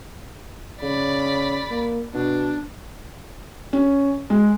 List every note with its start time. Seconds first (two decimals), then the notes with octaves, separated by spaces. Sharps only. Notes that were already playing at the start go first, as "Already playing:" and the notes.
0.82 C#3 D5 B5
1.70 A#3
2.14 B2 D4
3.73 C#4
4.30 G#3